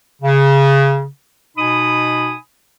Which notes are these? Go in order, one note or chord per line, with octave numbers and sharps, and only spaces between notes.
C#3
B2 D#4 G#5 B5 D#6